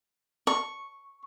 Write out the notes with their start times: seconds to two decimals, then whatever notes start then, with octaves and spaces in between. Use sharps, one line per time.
0.47 C#6